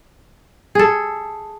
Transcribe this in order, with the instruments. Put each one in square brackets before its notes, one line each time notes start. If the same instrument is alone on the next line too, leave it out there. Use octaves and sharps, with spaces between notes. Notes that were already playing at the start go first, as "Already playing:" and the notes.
[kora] G#4 A4